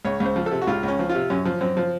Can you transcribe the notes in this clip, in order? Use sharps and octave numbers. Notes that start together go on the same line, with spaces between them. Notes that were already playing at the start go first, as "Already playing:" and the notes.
C#2 C#5
C#2
C5
F3
A4
C3
F#4
C#2 F4
C#2 C#4
F3
F4
C3
F#2 C#4
F3
F#2 C4
F3